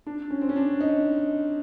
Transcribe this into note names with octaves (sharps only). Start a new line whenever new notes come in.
D4
C#4
C4
C#4
D4
D#4